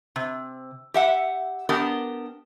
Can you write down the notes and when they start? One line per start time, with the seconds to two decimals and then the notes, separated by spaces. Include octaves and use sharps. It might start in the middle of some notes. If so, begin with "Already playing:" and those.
0.16 C3
0.94 G4 E5 F#5
1.69 B3 D4 G4 A#4